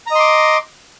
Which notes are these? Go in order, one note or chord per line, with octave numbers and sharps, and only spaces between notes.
D#5 A#5 C6 D6